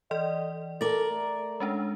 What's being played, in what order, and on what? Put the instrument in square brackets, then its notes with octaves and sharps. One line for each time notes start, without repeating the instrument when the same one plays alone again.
[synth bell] E3 D5 [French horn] D#5
[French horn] A4 [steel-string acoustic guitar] A#4 D5 [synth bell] A6
[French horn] A3
[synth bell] G#3 C#4 D4